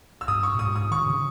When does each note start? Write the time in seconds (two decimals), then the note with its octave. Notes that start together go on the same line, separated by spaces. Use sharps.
0.21 E6
0.28 G2 D#6
0.43 C#6
0.54 A#2
0.59 G#2 D#6
0.76 D#6
0.91 D#3 C#6
1.07 C#3